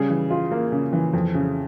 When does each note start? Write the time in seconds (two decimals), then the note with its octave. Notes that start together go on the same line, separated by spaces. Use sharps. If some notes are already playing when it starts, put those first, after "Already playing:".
Already playing: C#3 G3 G#4
0.10 E3
0.31 F4
0.52 A#3
0.72 C#3
0.93 E3
1.13 F2
1.34 C#3